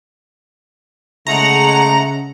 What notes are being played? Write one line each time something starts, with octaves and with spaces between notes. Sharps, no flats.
C#3 G#3 A3 F#5 A#5